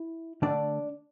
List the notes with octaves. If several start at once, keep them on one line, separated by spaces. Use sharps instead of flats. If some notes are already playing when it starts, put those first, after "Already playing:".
Already playing: E4
D3 A3 D4 D5